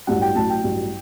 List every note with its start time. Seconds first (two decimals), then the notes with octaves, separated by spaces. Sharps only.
0.07 A1 G2 F#3 F#5
0.22 G5
0.35 A1 A2 F#3 A5
0.50 G5
0.64 A1 G2 F#3